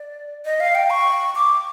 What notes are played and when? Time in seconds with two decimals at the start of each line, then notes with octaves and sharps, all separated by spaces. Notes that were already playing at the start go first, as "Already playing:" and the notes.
Already playing: D5
0.45 D#5
0.60 F5
0.75 G5
0.90 C#6
1.35 D6